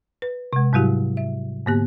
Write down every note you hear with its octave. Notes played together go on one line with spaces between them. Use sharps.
B4
C3 G#3
G#2 F#3 G3 E4 F#4 G4
E5
G#2 D3 A#3 B3 G4